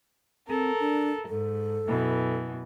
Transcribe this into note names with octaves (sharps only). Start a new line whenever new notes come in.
C4 A4 A#4
D4
G#2 A4
F#2 B2 E3